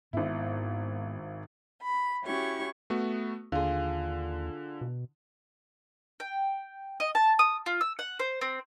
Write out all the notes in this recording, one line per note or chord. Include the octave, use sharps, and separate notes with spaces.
G#1 G#2 B3 E4
B5
C#4 E4 F#4 G4 C#6
A3 B3 F#4
D#2 D3 F4 G#4
B2
G5
D#5
A5
D#6
F4
E6
F#5
C5
C4